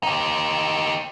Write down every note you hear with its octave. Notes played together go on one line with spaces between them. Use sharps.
D#4 G4